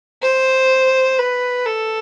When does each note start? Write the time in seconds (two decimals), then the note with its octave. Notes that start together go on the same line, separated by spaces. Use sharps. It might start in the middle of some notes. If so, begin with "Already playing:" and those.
0.22 C5
1.19 B4
1.66 A4